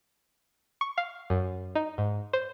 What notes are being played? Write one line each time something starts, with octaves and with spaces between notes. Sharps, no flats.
C#6
F5
F#2
D#4
G#2
C5